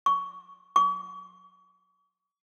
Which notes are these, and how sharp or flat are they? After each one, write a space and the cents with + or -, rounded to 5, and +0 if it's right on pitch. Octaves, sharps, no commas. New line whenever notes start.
C#6 +15
C#6 +40